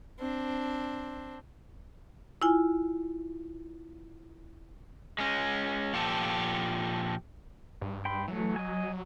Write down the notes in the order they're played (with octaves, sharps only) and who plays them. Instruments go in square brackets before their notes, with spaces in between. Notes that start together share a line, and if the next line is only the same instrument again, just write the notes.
[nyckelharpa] C4 D4
[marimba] E4 F4 G#5
[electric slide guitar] G#3 C#4
A#2 F3 G4 A4
[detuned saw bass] G2
[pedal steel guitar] G5 B5 C6
[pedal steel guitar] E3 A3 [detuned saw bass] F#3
[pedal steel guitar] D#5 G#5